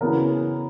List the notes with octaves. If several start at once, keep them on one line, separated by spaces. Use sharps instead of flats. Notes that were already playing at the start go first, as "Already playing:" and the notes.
C#3 E3 B3 F#4 A#4